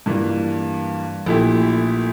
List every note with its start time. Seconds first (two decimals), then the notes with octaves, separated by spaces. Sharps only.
0.06 G2 E3 A#3 D4 F4
1.26 A#1 A#2 A3 E4 G4